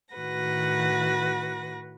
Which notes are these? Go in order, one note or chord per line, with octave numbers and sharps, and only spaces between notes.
A2 D#3 F#4 B4 F#5 A#6